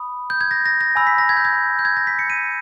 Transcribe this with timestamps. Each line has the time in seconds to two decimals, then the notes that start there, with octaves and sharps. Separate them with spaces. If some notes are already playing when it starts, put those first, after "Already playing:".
Already playing: B5 D#6
0.30 G6
0.41 G#6
0.51 A#6
0.66 A#6
0.81 A#6
0.95 G#5 B5 E6
1.07 B6
1.18 A#6
1.29 G#6
1.37 G6
1.45 G#6
1.79 G6
1.85 G#6
1.97 A#6
2.07 B6
2.19 C#7
2.30 D#7